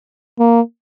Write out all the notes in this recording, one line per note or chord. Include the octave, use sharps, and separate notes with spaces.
A#3